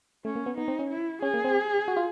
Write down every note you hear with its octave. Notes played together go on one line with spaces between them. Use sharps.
A3 C#4
A#3
B3
B3 D#4
C4
C#4
E4
C#4 G#4
A#3
C4
F#4
F4